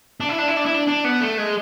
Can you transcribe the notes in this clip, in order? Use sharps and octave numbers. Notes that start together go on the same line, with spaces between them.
D4
E4
D4
E4
D4
E4
D4
D4
B3
A3
G#3